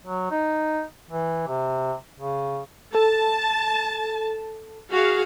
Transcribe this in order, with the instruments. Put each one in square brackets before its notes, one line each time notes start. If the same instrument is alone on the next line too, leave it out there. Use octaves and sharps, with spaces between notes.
[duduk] F#3
D#4
E3
C3
C#3
[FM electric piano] A4 [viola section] A5
[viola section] F#4 G#4 F5